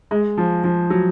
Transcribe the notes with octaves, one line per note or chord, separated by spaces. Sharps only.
G#3
F3
F3
F#3